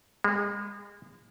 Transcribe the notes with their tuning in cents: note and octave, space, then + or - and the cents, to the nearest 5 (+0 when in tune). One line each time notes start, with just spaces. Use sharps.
G#3 -35